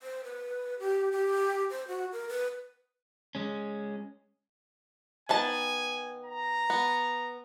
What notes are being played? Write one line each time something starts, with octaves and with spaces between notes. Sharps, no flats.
C5
B4
G4
G4
C5
F#4
A#4
B4
G#3 C#4
D#3 B3 G#5 A5
A#5
B3